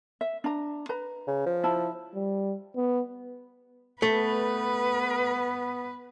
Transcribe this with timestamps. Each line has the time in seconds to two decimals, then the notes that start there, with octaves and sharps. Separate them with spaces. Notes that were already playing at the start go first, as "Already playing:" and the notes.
0.21 E5
0.44 D4 A#5
0.89 B4 A#5
1.27 C#3
1.46 F3
1.64 E4 A5
2.15 G3
2.76 B3
4.02 A3 B3 B4